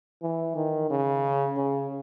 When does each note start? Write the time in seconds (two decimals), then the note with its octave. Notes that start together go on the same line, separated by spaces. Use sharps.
0.22 E3
0.56 D#3
0.90 C#3
1.57 C#3